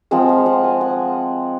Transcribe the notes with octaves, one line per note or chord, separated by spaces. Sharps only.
F3 G#3 C4 F#5
F5
F#5
G#5
F#5